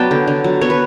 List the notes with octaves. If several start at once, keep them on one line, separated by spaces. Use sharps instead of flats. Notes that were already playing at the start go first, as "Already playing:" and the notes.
Already playing: F#3 B3 B4 D5 G5 A5
D3
D3
F#3
B3 C#5
B4